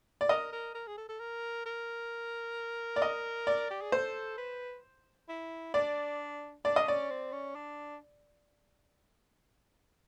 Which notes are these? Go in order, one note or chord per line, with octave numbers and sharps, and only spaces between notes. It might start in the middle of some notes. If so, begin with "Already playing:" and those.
D5
A#4 D#5
A#4
A#4
G#4
A4
A4
A#4
A#4
D5
D#5
D5
G4
G#4
A4 C5
B4
E4
D4 D5
D4 D5
D#5
C#4 D5
C4
C#4
D4